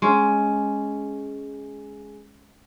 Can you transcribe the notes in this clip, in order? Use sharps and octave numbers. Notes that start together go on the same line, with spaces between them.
G#3 C#4